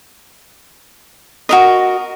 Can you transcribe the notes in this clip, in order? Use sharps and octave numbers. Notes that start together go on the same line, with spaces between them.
F#4 A#4 D#5